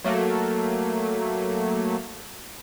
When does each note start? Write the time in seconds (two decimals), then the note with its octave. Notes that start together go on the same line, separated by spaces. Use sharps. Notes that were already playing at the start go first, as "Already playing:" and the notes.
0.04 F#3 A3 A#3